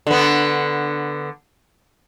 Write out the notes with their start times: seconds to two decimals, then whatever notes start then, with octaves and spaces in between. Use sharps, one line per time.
0.07 D3 B3